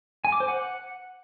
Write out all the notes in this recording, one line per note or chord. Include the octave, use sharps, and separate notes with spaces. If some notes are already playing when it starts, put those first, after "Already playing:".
G#5
D6
C5
F#5